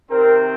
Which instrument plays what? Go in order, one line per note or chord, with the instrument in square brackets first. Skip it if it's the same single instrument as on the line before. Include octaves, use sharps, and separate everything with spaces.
[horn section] C3 D#3 C4 [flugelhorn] A#4